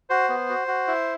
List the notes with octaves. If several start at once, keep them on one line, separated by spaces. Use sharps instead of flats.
F#4 C5
B3
F#4
F#4
E4